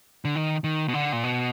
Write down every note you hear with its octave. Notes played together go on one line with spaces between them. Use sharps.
D3
D#3
D#3
B2
D3
A#2
B2